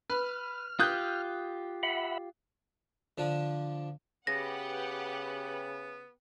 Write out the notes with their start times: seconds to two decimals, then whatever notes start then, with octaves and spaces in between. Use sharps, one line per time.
0.10 B4 F6
0.79 F4 G4 D#6 F#6 G6
1.83 E5 F#5 B5
3.18 D3 F3 D4
4.27 C#3 B3 G4 B4 F#5 A#6